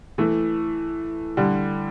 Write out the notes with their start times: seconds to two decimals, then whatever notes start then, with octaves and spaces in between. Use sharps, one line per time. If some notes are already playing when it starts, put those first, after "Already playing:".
0.18 E3 A3
1.37 D3 G3